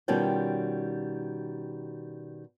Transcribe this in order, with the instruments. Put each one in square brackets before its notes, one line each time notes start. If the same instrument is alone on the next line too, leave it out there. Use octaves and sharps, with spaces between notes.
[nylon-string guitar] B2 D#3 G3 C#4 F4 G5